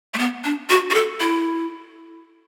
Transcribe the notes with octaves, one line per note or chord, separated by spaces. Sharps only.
A3
B3
D4
F#4
F#4
A4
E4